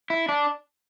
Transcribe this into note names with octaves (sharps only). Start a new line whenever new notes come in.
E4
D4